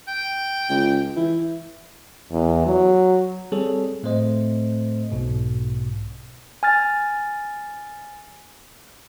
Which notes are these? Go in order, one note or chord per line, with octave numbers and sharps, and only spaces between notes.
G5
C#2
E3
E2
F#3
G3 C4 G#4 A4 C#5
A2 A3 C4 C5 D#5
B1 G#2 B2
G#5 F6 A6